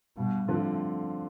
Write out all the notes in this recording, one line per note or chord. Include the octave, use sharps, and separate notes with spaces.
G2 B2
A2 D3 F3 C4 F4